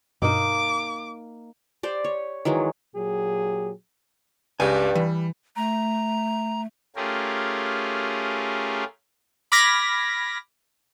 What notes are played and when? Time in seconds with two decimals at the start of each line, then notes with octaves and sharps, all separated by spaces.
0.22 G2 B2 A#3 D#4 D6
1.83 G4 C5 D5
2.04 C#5
2.45 D#3 E3 F#3 G#3
2.95 A#2 F#3 G4 G#4
4.60 C#2 G2 C#3 G4 G#5
4.95 E3 G3
5.56 A3 A#5
6.96 A3 C#4 F4 G4 G#4 A#4
9.52 B5 D6 F6 G#6 A#6 B6